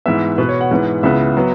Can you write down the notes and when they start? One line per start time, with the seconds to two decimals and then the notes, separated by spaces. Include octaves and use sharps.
0.06 G#2 E3 B3 E5
0.38 B2 B3 B4
0.49 C#5
0.61 F#5
0.71 G#2 E3 B3 F#5
1.03 C#2 C#3 E3 B3 E5
1.37 F#3 B3